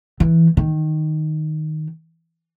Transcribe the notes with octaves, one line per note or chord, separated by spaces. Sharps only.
E3
D#3